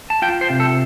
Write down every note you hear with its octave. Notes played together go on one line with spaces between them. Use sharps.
A5
F4 G5
C5
C3
A4